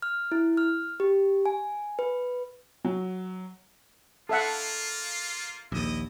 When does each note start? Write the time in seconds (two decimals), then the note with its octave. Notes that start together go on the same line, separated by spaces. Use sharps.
0.02 F6
0.32 E4
0.57 F6
1.00 G4
1.46 G#5
1.99 B4
2.85 F#3
4.29 A#3 F4 A4 E5 F#5
5.72 A#1 D#2 E4 D#5